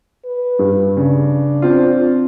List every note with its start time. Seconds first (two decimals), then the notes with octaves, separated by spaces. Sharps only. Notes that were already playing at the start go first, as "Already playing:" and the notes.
0.25 B4
0.59 G2
0.97 C#3 D4
1.62 C4 F4